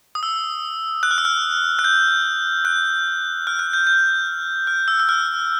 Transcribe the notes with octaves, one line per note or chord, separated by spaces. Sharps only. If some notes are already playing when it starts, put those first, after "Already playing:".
D#6
E6
F#6
F6
E6
F6
F#6
G6
F#6
F6
F#6
G6
G6
F6
E6
E6
F6